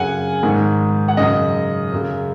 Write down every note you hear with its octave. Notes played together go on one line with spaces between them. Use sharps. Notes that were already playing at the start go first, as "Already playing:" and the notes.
Already playing: F#2 C#3 F#5 G#5
G#2 D#3
F#5
F#2 C#3 D#5
F#2 C#3